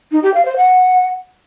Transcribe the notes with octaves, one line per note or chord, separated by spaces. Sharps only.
D#4
G4
F5
C5
F#5